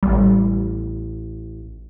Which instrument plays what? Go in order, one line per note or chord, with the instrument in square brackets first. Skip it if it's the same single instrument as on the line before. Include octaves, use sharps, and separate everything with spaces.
[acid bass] A1 [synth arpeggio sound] G3